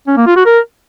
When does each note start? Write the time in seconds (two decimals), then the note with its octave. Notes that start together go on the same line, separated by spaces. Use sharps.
0.08 C#4
0.17 A#3
0.27 F4
0.36 F#4
0.46 A#4